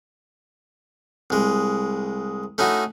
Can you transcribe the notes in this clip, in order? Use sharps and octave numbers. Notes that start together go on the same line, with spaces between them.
C2 G#3
A3 C#4 D#4 E4 F#4